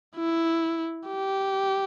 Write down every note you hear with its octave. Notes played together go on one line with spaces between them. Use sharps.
E4
G4